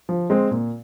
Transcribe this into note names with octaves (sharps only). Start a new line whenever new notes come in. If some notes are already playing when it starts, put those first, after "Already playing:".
F3
G#3 C4
A#2